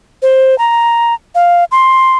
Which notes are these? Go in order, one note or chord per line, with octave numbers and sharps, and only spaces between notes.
C5
A#5
F5
C6